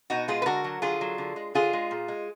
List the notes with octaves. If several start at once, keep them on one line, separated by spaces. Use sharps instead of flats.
B2 D#4 F#4
G#3 F4 G#4
B4
D3 F#4 A#4
F#3
D3 F4 G#4
F#3
D3
G#3
D3 F4 G#4
G#3
A#2
G#3